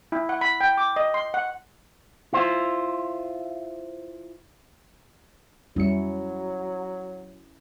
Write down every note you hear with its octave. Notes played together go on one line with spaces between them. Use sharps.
E4
F#5
B5
G5
D6
D#5
C6
F#5
E4 F4 C5
F2 F#3 G3 C#4 E4 C#7